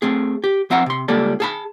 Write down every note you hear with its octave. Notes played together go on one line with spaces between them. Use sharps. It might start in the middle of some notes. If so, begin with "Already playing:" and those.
A3 C4 G#4
G4
F2 C4 E5 F#5 A#5
C3 C6
C#2 G3 A#3 A4 D5
G#4 A5 B5